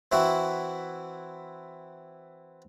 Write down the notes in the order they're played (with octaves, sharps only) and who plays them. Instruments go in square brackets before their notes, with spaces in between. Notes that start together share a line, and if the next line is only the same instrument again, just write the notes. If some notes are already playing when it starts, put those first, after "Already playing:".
[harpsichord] E3 C4 E4 F#4